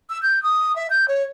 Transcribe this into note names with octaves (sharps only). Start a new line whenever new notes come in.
E6
G6
D#6
E5
G6
C#5